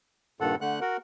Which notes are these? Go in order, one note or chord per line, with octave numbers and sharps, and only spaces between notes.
G2 A#2 D#3 A4 F#5
D3 A3 F#5 F#6
F#4 A#4 F#5